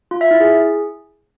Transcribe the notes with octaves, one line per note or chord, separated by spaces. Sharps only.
F4
E5
E4
G#4